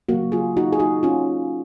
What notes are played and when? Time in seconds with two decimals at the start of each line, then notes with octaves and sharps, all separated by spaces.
0.09 C#3 F#3 A#3 F#4 A#4
0.32 F4 G#4
0.57 D#4 F#4
0.73 G#4
0.79 D#4 F#4
1.03 C#4 F4